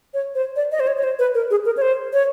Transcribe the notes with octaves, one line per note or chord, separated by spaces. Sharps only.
C#5
C5
D5
D#5
C5
C#5
C#5
C5
B4
A#4
G#4
A#4
C#5
C5
C#5